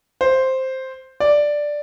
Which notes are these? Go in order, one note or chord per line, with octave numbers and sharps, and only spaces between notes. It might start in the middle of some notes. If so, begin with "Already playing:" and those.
C5
D5